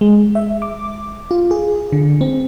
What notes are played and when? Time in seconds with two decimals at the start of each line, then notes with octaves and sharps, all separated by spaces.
0.01 G#3
0.35 E5
0.62 D6
1.31 F4
1.51 G#4
1.92 D3
2.21 C4